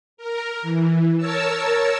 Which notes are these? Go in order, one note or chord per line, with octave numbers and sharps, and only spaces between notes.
A#4
E3
A#4 C#5 A5 E6